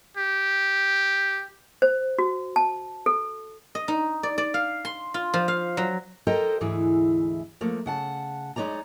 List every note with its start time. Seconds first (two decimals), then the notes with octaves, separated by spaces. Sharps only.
0.17 G4
1.82 C5
2.19 F#4
2.56 A5
3.06 A4
3.75 D#5
3.88 D#4
4.23 D5
4.38 D5
4.54 F5
4.85 C6
5.14 F4
5.34 F3
5.48 F5
5.77 F#3
6.27 A4 A#4 C5 D#5 G5 A#5
6.61 D2 G#2 E3 E4 G#4
7.61 F3 A3 A#3
7.86 C#3 F#5 A5
8.56 G#3 D#4 C#5 D5 A#5